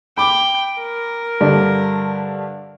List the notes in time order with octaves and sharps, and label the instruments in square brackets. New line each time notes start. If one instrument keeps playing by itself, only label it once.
[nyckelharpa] G5 [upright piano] B5 D6
[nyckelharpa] A#4
[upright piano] G2 D3 D4